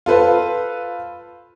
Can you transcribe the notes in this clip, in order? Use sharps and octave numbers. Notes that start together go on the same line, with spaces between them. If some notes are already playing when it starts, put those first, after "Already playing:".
F4 A4 B4 C5